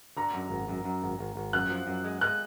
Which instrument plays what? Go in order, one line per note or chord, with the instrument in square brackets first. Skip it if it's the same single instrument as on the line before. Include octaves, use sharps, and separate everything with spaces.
[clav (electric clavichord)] D3 [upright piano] A#5
[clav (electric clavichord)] F#2
G#1
F#2
F#2
G#1
G#1
G#1
[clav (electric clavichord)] F#2 [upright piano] F#6
[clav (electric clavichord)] F3
F#2
G#3
[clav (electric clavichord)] G#3 [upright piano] F#6